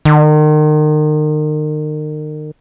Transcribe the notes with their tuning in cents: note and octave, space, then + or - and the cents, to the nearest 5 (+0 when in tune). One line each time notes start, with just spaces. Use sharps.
D#3 -35